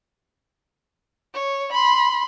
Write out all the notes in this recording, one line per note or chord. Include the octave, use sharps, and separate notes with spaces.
C#5
B5 C6